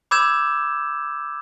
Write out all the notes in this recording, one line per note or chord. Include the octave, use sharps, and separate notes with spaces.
B5 D6 E6 G6 G#6 E7